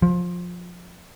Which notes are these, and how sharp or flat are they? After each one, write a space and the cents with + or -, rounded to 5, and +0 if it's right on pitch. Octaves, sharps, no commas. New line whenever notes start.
F3 +20